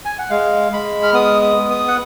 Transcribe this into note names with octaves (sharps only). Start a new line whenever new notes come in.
G#5
F#5
G#3 F5
G#3 B5
F6
B3 D#6
D#6
B3
D#6
F#5